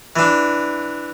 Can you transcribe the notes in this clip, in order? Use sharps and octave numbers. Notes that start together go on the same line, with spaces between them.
E3 D4